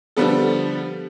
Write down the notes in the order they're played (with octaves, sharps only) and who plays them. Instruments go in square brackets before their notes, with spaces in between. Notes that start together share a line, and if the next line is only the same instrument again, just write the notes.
[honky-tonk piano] D3 F3 G3 B3 A4